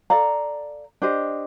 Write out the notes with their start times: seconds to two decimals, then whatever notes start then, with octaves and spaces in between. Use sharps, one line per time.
0.10 A4 D5 F5 A#5
1.02 D4 G4 C5 D#5